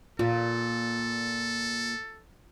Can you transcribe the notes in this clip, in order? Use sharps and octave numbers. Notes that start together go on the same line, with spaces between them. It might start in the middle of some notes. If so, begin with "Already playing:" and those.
A#2 F4 A4